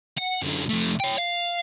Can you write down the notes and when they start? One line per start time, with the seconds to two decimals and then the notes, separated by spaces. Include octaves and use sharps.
0.17 F#5
0.42 F#2 D3
0.69 F2 A3
1.00 C#5 G5
1.18 F5